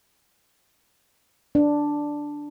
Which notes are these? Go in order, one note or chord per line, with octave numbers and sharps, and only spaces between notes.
D4